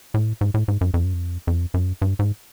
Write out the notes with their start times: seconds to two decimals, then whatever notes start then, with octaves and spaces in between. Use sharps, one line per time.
0.14 A2
0.41 G#2
0.54 A2
0.68 G#2
0.81 F#2
0.94 F2
1.04 F#2
1.14 F2
1.47 F2
1.74 F#2
2.02 G2
2.19 G#2